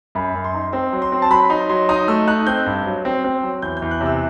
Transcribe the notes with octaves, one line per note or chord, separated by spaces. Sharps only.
F#2 B5
F#2
C6
D#4
C4 C6
F#3
C6
C4
A5
F#3 B5
D#4 C6
F#3 C6
D#4 D#6
A3 E6
D#4 F#6
C4 G6
G2
F#3
C4
C4
F#3
E2 G6
G6
E2
F#6
C3
E6